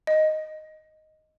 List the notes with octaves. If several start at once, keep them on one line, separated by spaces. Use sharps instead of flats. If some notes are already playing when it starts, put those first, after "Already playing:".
D#5